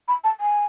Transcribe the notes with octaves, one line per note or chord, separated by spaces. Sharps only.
B5
A5
G#5